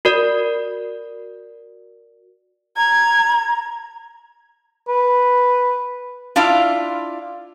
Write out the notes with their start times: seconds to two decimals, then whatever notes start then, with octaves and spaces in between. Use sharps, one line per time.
0.05 F#4 A#4 D5
2.77 A#5 G#6
4.88 B4
6.36 D4 E4 F4 D5 F5